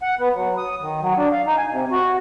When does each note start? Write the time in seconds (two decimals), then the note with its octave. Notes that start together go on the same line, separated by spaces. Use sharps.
0.02 F#5
0.19 B3
0.34 F#3
0.58 D#6
0.81 D#3
1.02 F#3
1.17 D4
1.33 F5
1.46 D#4
1.58 G#5
1.71 C3
1.92 F#4